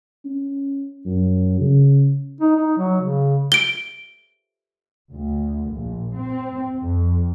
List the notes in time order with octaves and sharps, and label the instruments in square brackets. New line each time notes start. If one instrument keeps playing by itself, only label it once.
[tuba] C#4
F#2
C#3
[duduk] D#4
D#4
F#3
C#3
[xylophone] D7 G7
[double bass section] D2
A#1
C4
F2